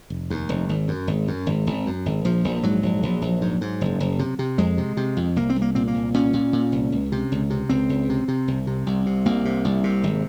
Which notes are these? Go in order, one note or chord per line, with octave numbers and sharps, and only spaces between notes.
F1
D#2
F1
G#1
F#2
G#1
F#2
G#1
G#1
F#2
G#1
A#1 F3
A#1
G#2 F#3
A#1
A#1
A#1
G#2
G#2
F#1
F#1
C3
C3
F2 G#3
C3
C3
F2
C2 A#3
C4
C2
A#3
A#2 C4
A#3
C2
A#2 C#4
A#2
A#2
C2
C#2
C3
C#2
C3
C#2 C4
C#2
C3
C3
C2
C3
C2
C3
C2 A#3
C3
C2
C3
G#1